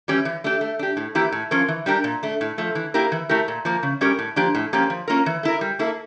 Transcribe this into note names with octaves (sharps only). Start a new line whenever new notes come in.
E3 G3 C#4 G4
E3
A3 D4 G4
A3
D4 G4
A2
E3 A#3 E4 G4
A2
F3 C#4 F4 A#4
E3
G3 D4 G4 A#4
A#2
A3 D4
A2
F3 A3
E3
A#3 E4 G4 A#4
E3
A3 E4 G4 A#4
A#2
F3 A#3
C#3
G3 C#4 G4 A#4
A2
F3 A#3 D4 G4
A2
F3 A#3 C#4 G4
F3
A#3 C#4 F4 A#4
E3
A3 E4 A#4
G3
A#3 E4 A4